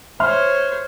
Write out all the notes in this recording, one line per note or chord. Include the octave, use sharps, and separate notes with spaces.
C5 C#5 E5 C6 F6